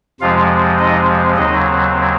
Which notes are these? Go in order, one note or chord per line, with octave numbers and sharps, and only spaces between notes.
F2 C3 F3 G#3 C4 F4 F5
D#4 D#5
D#2 C#3 F#3 C4 D#4 D#5